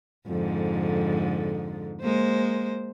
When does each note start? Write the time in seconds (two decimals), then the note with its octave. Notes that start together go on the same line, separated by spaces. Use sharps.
0.27 F2 G#2 D3
2.02 G#3 A#3 C5